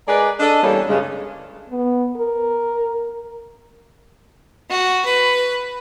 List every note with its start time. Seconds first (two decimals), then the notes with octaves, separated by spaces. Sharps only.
0.08 G#3 G#4 A#4 B4 D5
0.40 D4 A4 D#5
0.63 E2 G3 A#3 C#4 A4 C#5
0.89 G2 C#3 G#3
1.70 B3
2.16 A#4
4.70 F#4
5.05 B4